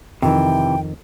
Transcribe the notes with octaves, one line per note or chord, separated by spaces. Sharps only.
F2 C3 D#3 E3 G5